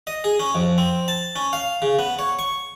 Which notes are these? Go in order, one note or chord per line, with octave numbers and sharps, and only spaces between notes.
D#5
G#4
C#4
F2
C4
A5
C#4
F5
C#3
B3
C#5
C#6